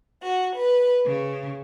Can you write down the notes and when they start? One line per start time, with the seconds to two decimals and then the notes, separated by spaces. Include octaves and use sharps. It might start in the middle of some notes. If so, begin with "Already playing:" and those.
0.22 F#4
0.56 B4
1.06 C#3